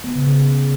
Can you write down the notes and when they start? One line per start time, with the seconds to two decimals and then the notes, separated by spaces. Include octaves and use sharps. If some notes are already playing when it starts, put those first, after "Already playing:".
0.04 B3
0.15 C#3
0.27 C#3